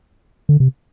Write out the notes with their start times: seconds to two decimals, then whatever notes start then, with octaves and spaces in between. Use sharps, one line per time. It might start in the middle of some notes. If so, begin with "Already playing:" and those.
0.49 D3
0.60 C3